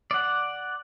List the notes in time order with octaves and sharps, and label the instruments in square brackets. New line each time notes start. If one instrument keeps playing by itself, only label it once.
[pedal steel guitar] D5 F#5